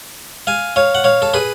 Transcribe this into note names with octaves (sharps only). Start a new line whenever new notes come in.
F5 G#5
C#5 F5
F#5
C#5 F5
A4
G#4 B4